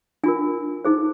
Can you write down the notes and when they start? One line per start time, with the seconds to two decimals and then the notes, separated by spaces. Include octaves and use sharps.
0.24 D4 F4 A#4 G#5
0.85 D#4 G#4 C5